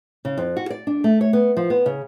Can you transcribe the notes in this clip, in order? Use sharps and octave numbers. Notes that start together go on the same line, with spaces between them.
C#3
F2
F#4
D5
D4
A3
C#5
B3
F3
B3
C#3